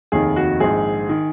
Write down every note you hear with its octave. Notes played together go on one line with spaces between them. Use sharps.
F1 D#2 D#3 G#4
F#4
A#1 G#2 D#3 G#4
D#3